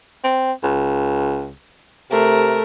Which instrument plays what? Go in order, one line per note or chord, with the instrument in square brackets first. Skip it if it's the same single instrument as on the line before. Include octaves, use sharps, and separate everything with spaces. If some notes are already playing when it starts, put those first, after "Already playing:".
[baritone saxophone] C4
C#2
[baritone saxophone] C3 [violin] A3 A#4